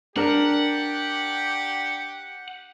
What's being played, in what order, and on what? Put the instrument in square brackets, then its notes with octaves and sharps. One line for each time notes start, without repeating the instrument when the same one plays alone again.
[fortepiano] D4 A#4 [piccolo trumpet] G4 [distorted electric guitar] F#5